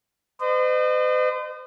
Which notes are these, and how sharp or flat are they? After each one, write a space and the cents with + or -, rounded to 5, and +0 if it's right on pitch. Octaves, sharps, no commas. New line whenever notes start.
C5 -45 D#5 -35